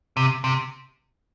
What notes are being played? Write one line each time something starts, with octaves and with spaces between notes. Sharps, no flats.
C3
C3